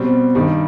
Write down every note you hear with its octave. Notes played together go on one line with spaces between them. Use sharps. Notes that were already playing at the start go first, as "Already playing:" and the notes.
Already playing: B2 G3 C4
G2 D#3 G3